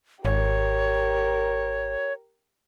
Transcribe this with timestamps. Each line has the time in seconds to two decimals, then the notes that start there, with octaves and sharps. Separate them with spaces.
0.25 G#1 G4 A#4 C#5